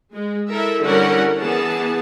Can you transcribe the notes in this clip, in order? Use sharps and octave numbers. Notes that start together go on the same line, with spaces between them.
G#3
E4 A4 A#4 E5
D3 G3 C#4 E4 A#4 F#5
E3 B3 G#4 A5